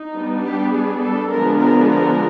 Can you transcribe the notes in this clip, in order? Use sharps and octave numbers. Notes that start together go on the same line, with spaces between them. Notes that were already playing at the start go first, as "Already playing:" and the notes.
Already playing: D#4
G3 B3 D4
G4
G#4
A4
D3 F3 G#3 B3 D4 A#4
A#4
A#4